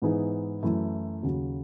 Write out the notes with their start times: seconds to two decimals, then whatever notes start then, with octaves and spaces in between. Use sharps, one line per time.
0.02 G#2 E3 B3 D#4 G#4
0.63 F#2 E3 A3 E4
1.23 D#2 C#3 F#3